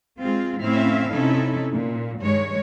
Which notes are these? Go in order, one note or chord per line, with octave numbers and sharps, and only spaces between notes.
G#3 C4 F4 G#4
A2 C4 C#4 E4 E5 F5
C3 C#4 D#4 E4 A4
A#2
G2 D#3 G#3 C#5